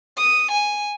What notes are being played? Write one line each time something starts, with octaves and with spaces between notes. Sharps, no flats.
D#6
G#5